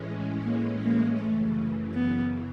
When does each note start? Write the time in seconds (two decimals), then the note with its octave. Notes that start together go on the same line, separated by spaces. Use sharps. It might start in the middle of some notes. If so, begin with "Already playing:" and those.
Already playing: A2 E3 G#3 C#4
0.44 A#3
0.81 A#3
1.19 F#2 C#3 E3 A3
1.94 B3